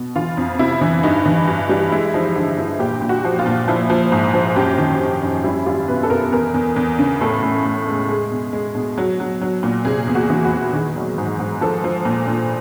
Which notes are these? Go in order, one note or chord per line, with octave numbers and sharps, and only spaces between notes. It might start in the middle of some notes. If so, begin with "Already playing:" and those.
Already playing: B2
E3 F4
F2
C3 E4
E3
G2 D#4
E3
G2
G3
G#3 E4
F3 D#4
D3 E4
G2 E4
A#2 G4
A#2
F#4
F3
F4
A#2
F3 E4
F3
G#2
F3
F#2 G4
D#3
F#2
F#2
G3 E4
G3 F4
B2 B4
A4
B2 A#4
E2 A#4
E2
E2
C#3
A2 A4
A2
A2
G#3
G#3 G#4
B2
G#3
B2
F#3
F#3
F#3
A#2
C3 G#4
E2
F#4
E3
F#4
E2
D#3 G#4
F#3
G#2
G#2
F3 A4
F3
A#2
A#2